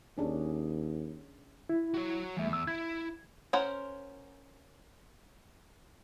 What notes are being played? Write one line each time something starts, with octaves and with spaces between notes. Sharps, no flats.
D#2 C#4 D4 G#4
E4
F#4 C#5
E2 G3 A3 E5
E6
E4 G#6
C#4 A#4 C5 F#5